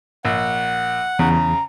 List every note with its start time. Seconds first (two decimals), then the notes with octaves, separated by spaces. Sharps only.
0.25 A#1 F#5
1.19 E2 C#3 A#5